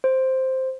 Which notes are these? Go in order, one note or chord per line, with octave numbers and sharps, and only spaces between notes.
C5